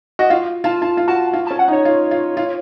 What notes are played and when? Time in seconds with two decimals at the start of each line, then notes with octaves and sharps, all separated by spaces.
0.19 F#4 D#5
0.30 F4 F5
0.64 F4 A5
0.82 F4 A5
0.97 F4
1.07 F#4 A5
1.33 F4
1.47 C#4 A5
1.59 F#5
1.68 D#4
1.72 C#5
1.85 F4
2.11 F4
2.37 F4